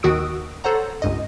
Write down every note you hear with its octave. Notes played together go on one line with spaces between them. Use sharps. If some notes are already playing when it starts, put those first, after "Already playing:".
D#2 D#3 F#4 D#6 E6 D7
A4 C5 C#5 F#5 A#5
C#2 G2 D#5